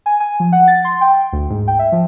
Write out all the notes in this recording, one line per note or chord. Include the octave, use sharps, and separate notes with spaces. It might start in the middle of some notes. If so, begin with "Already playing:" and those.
G#5
G#5
F3
F#5
A6
C6
G5
D2
G#2
G5
E5
F3